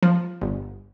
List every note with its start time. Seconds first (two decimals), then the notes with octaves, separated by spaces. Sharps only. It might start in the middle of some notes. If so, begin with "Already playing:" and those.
0.03 F3
0.41 G1